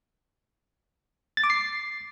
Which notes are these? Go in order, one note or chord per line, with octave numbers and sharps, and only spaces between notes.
A6
D6
C7